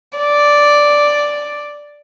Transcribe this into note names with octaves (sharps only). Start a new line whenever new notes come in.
D5